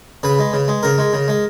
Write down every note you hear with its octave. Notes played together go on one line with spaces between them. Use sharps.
C#3 B4
G#3
C#3
G#3
C#3 A#4
G#3
C#3
G#3